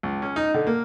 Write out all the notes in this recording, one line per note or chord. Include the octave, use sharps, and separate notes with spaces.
C#2
C#4
D#4
D3
A#3